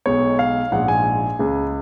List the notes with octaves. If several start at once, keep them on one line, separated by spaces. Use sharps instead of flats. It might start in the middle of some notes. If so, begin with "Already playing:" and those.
B1 B2 G#3 C#5
F5
A#1 G#2 F3 F#5
G#5
C#2 C#3 G#3